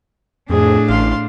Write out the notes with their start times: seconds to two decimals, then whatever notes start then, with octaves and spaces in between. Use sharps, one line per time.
0.50 F2 A2 D4 G#4
0.89 A1 F5 C6